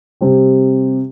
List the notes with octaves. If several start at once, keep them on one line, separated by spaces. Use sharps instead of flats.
C3 G3 C4 G4